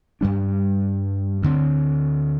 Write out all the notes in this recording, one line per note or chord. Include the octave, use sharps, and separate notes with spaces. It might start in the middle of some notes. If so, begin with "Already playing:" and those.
G2 G3 D4
D2 D3 C4